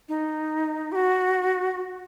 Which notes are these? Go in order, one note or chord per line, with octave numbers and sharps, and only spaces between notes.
D#4
G4
F#4